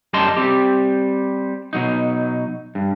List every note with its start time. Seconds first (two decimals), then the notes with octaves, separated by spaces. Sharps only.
0.13 F#2 G3 G4 D#5 A5 C6
0.37 G3 C4 G4
1.73 B2 F#3 D#4
2.75 G2